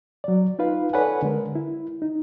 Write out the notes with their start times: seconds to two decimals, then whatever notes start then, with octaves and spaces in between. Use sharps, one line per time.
0.24 F#3 D5
0.59 D#4 F4 B4 F5
0.93 A4 B4 C#5 D5 F#5 G#5
1.23 D3 G#3 A#4
1.55 E4
2.02 D#4